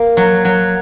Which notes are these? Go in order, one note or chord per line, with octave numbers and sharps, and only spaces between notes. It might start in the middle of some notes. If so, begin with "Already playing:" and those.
Already playing: A#3
F#3
F#3